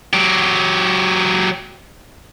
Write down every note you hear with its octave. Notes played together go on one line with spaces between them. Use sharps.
F#3 G4